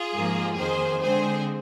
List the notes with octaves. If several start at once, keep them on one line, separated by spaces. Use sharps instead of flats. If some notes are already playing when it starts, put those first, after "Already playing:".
Already playing: F4 G#4
G#2 F3 A#3
F2 D#3 A#3 G#4 C5
D3 G#3 C4 G#4 C5